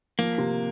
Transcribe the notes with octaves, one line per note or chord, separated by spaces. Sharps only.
F3 A#3
C3